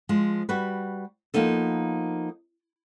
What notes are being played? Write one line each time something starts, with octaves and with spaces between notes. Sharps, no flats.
F3 G#3
G3 F#4 B4
F3 G3 A#3 B3 D#4 A4